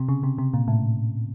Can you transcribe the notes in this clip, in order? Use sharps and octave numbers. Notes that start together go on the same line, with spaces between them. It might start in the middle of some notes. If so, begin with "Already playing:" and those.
Already playing: C3
C#3
C3
C3
A#2
A2